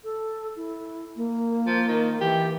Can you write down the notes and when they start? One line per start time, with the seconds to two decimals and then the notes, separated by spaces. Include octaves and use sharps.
0.04 A4
0.56 E4
1.16 A#3
1.67 F3
1.88 D#3
2.21 E3 G4